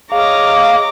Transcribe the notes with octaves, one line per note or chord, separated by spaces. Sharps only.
G#4 C#5 D#5 F5 A#5 D6